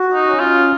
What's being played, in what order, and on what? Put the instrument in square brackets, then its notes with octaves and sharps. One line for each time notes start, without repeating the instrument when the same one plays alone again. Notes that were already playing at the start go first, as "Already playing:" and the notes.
Already playing: [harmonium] F#4
[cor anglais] D#4
[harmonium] C#4
[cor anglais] F4